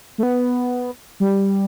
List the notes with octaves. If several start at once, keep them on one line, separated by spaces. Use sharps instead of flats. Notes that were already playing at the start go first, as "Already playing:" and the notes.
A3
B3
G3